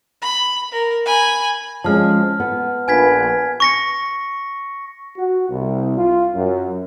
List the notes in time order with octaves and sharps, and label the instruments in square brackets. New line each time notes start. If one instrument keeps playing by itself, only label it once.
[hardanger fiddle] B5
A#4
G#5 B5
[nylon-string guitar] F3 G#3 C#4 [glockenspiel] A5 F6
[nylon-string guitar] B3
[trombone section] A#1 B4 [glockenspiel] G#5 G#6 B6
[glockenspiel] C#6 A#6 C#7
[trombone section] F#4
C2
F4
F#2